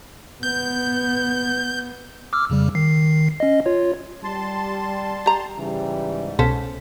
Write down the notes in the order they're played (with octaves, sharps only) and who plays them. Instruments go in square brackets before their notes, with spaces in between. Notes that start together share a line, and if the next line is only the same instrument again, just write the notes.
[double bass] B3 [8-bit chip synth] G6
[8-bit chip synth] D6 E6 F6
F2 C#3 G3
D#3 C7
C#4 D#5
F4 C#5
[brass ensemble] G3 [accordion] A5 C6
[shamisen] G4 A#5
[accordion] G#2 [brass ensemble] C#3 E3 G3
[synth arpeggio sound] C2 B2 B6 [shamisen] C#4 A4 C5